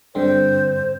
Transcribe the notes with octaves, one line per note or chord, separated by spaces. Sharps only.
G2 D3 C4 C5